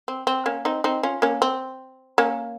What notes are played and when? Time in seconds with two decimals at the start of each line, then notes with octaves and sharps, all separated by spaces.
0.08 C4
0.27 C4
0.46 A#3 C#4
0.65 C4 D#4
0.84 C4 D#4
1.03 C#4 F4
1.22 A#3 C#4
1.42 C4
2.18 A#3 C#4